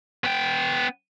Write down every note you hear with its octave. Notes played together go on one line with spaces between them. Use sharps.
B3 G5